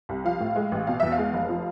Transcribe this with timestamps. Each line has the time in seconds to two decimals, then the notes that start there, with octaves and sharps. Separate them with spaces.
0.09 C2
0.24 F3 F5
0.40 A2
0.56 G#3
0.72 A1
0.87 B2 F5
1.00 E2 E5
1.12 F5
1.18 G#3
1.34 F1
1.49 F3